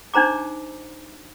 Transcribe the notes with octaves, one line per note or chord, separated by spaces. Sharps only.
D4 D#4 C5 A#5 D6